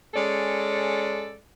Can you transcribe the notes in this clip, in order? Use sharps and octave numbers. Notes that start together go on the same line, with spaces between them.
G#3 C#4 A4 D5